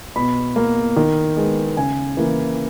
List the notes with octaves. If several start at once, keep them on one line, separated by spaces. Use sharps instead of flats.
B2 B5
A#3
D#3
G#3 B3
C#3 G#5
E3 A#3